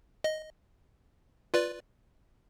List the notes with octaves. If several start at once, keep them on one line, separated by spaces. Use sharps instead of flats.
D#5
F4 B4 D5